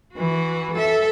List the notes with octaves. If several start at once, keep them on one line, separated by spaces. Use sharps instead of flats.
E3 F#4
A4 E5